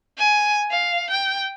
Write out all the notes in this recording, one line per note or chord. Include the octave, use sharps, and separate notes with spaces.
G#5
F5
G5